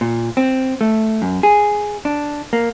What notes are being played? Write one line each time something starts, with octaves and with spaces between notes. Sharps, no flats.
A#2
C4
A3
F#2
G#4
D4
A#3